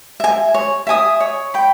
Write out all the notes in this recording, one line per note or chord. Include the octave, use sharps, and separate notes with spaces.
E5 G#5
C#5
E5 G#5 D#6
C#5
G5 B5